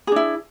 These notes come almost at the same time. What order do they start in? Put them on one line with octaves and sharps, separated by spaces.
G#4 D4 E4